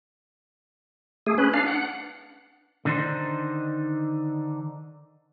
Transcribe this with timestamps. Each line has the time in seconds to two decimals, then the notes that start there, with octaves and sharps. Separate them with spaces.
1.27 A3 G#4
1.38 C#4 B4
1.54 D4 F5
1.66 F#5
2.85 D3 D#3 D4 D#4 C5